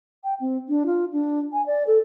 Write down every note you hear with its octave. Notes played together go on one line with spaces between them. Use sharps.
G5
C4
D4
F4
D4
G#5
D5
A4